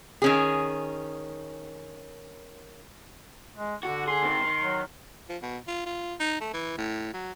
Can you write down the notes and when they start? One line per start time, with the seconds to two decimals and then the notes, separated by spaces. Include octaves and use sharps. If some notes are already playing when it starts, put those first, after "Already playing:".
0.22 D#3 C#4 G#4
3.57 G#3
3.83 D3 F#4
4.08 G#4 C6
4.23 D#3 C4
4.42 D#3
4.63 F#3
5.29 F3
5.42 B2
5.67 F4
5.86 F4
6.20 D#4
6.40 A3
6.53 E3
6.78 A2
7.14 F#3